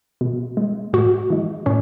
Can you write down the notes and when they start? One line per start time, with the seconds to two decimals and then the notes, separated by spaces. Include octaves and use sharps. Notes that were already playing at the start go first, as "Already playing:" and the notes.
0.21 B2
0.57 G#3
0.93 A2 F#4
1.30 E3 G#3
1.66 A2 C#4